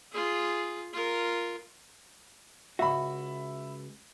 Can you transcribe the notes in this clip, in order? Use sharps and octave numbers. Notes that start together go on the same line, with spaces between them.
F4 G#4
F4 A#4
C#2 G#2 F#4 E5 B5